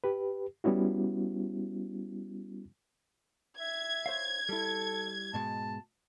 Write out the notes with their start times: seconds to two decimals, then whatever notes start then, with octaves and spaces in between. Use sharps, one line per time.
0.04 G4 B4
0.64 G3 B3 C#4 E4 F#4
3.59 E5 G#6
4.06 C5 C#5 F5
4.49 G3 E4 A4
5.34 G#2 B2 G#3 A5